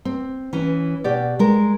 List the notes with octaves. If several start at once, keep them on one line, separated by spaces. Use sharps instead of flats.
C4
E3 C#4
B2 G4 D5
G#3 A#4